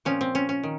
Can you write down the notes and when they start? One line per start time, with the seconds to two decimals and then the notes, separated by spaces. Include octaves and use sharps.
0.05 A#2 F3 C4 C#4
0.21 C4
0.35 C#4
0.49 C#4
0.63 D#3